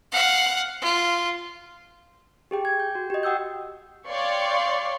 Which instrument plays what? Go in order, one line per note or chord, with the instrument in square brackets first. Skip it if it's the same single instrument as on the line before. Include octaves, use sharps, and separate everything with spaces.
[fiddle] F5 F#5
F4
[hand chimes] G4 G#4 G5
G#6
G6
F#4
G4 D#5
F#5 G5 D#6 E6 G6
[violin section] C#5 D5 F5 G5 C6 C#6